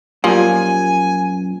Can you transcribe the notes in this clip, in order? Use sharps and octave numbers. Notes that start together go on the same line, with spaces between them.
F#2 A#2 F3 G3 A#3 G#5